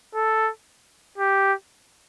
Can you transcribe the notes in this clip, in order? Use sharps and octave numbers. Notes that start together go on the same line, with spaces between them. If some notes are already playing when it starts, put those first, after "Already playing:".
A4
G4